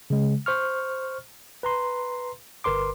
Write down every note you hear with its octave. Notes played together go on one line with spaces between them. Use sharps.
C#3 G#3
C5 C#6 F6
B4 A#5 C6
G1 A#4 B4 C6 D6